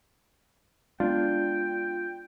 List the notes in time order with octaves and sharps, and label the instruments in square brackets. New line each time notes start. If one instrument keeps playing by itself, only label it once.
[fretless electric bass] G#3 A3 B3 [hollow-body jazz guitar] D4 [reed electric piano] F4 [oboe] G5